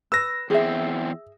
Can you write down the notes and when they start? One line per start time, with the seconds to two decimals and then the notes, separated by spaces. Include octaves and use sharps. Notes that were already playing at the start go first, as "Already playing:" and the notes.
0.12 B4 E6 A#6
0.50 E2 C4 G#4 E5